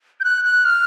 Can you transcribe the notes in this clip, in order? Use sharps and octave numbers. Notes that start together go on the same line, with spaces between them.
G6
F#6
F#6
F6